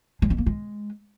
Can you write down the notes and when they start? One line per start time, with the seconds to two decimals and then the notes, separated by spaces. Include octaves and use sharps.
0.22 G#3
0.30 C#4
0.38 A#3
0.46 G#3